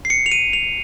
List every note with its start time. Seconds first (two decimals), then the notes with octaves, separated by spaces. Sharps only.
0.05 C7
0.10 C#7
0.26 F7
0.32 D#7
0.53 F7